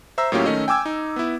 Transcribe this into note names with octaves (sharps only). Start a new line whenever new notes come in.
C5 E5 A#5 E6
A2 F#3 A#3 C#4 F4 G4
D#3 A3 C#4 D#5
G5 G#5 D6 E6 G#6
D#4
B3 E4